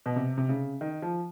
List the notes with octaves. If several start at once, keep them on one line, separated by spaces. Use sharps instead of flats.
B2
C3
C3
C#3
D#3
F3